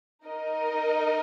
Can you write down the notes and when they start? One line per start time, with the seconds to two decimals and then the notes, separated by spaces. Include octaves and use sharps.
0.25 D#4 A#4 D#5